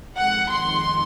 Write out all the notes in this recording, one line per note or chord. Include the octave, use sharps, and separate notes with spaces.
F2 D#3 G#3 F#5
C6